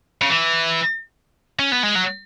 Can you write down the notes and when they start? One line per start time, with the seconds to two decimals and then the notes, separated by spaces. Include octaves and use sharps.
0.22 C#3
0.29 E3
1.59 C#4
1.72 B3
1.83 G#3
1.95 F#3